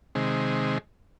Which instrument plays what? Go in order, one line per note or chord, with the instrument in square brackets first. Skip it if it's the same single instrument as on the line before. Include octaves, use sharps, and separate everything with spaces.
[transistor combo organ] C3 D#3 G#3